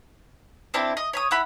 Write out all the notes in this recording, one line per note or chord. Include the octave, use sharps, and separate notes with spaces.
C4 D4 E4 A4
D#5
C#5 B5 D#6
E4 F#5 B5